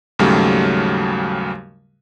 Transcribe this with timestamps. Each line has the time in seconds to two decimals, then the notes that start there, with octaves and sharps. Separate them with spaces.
0.19 D#2 G#2 C#3 F#3 G3 A3